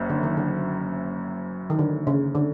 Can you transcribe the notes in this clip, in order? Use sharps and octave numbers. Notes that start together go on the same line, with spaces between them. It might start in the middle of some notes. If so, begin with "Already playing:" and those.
Already playing: F#1 F#2
D3
D#3
D3
D#3
D3
C#3
D3